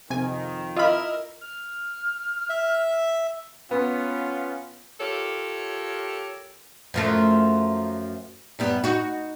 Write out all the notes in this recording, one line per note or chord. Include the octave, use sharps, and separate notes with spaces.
F2 C3 D#3 G#5
E4 F4 A#4 D#5 B5 E6 F6
F6
E5
B3 C#4 F4
F4 G4 A4 A#4 C#5
F#2 F3 A3
F#2 G3 B3
D#4 F#4